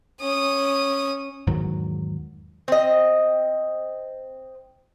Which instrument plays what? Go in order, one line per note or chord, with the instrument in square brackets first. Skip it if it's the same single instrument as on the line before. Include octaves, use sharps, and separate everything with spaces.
[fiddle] C#4 D#6
[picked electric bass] E2 G#2 D#3 F#3
[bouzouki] C4 D#5